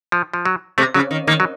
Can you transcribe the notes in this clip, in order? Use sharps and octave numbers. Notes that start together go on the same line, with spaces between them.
F3
F3
F#3
C3 A3
C#3 F#3
D#3
D#3 A#3
F#3